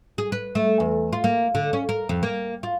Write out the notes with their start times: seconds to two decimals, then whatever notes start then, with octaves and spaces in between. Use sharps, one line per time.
0.18 G#4
0.32 B4
0.55 A3
0.80 E2
1.13 F4
1.24 A#3
1.55 D3
1.73 C#4
1.89 A#4
2.09 F2
2.23 A#3
2.63 F4